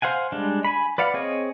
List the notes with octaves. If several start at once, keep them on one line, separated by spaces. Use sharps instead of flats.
C5 F5 F#5 G#5
G3 G#3 D4
G#5 B5
B4 D5 F5 F#5
C4 G#4 C#5 D#5